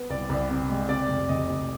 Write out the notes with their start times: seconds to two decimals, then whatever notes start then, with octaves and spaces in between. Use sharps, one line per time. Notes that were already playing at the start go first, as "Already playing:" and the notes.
Already playing: B3
0.10 C2 D5
0.29 C2
0.50 C3
0.69 G#3
0.89 C3 D5
1.09 F1
1.29 F1 D#5
1.49 F1